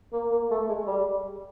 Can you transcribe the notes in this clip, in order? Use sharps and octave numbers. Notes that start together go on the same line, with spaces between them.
A#3
A#3
A3
G#3
G3